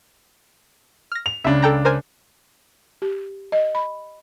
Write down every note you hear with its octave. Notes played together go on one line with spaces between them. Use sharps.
F6 A#6
F7
C#2 C#3 D4 E5
A4 G5 A#5
A#4 C5 G#5
G4
D#5
B5